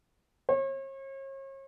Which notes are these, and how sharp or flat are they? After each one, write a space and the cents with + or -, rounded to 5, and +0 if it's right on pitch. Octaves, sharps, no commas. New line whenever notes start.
C#5 -40